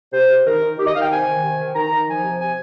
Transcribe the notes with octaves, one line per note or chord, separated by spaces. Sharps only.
C3 C5
C3
D#3 A#4
D#3
D#3 G4
D#5
D#3 F5
G5
C3 G#5
D#3
C3
D#3
D#3 A#5
D#3
F3 G#5
C3
C3 G#5